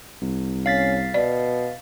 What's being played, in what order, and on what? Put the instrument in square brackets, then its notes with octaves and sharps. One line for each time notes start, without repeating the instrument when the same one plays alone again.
[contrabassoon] C2
[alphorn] C#4 [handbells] F5 A6 B6
[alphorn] B2 [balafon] D5